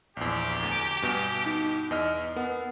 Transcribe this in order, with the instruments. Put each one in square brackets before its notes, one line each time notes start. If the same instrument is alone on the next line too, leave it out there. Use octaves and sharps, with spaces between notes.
[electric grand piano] A#1 E2 [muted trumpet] G4
[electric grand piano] D2
[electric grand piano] G2 B2 [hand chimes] G#5
[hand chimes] D#4
[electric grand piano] E2 D#5 F6
[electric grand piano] B3 [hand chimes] A#4 F#5